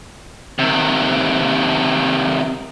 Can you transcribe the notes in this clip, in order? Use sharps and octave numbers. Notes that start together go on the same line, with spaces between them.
C3 D#3